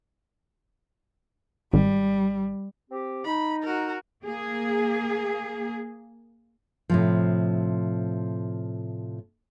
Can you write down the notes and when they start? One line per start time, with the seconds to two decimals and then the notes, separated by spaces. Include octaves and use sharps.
1.73 G#1 G3
2.90 C4 G4
3.25 D#4 B5
3.63 F#4 A#4
4.24 A#3 G#4
6.90 A2 C3 F3